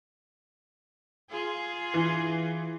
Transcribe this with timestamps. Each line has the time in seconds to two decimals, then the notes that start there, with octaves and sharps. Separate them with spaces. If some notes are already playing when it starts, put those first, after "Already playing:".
1.30 F4 G#4
1.94 E3